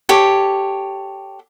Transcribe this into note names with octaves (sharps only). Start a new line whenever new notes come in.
G4 A4 C#5